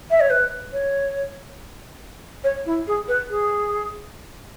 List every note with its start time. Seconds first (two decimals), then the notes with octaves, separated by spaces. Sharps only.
0.11 E5
0.20 C#5
0.30 B4
0.73 C#5
2.44 C#5
2.66 E4
2.87 G#4
3.08 B4
3.30 G#4